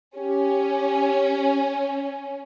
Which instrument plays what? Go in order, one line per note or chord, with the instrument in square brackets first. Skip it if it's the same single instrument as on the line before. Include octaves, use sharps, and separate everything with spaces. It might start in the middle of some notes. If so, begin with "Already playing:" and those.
[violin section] C#4 [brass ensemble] G4